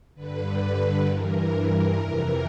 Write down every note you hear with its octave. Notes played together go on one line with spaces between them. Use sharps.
G2 D3 B4
G2 E3 A#4
A#4
F2 C3 E3